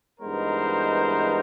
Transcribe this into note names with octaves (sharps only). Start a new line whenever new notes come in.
G2 E3 G#3 B3 D#4 A#4 C5